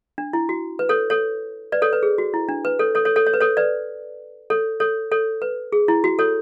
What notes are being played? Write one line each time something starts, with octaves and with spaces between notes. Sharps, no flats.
D4
E4
F#4
B4
A4 C#5
A4 C#5
B4 D5
A4 C#5
B4
G#4
F#4
E4
D4
B4
A4 C#5
A4 C#5
A4 C#5
A4 C#5
C#5
B4
A4 C#5
B4 D5
A4 C#5
A4 C#5
A4 C#5
B4
G#4
E4
F#4
A4 C#5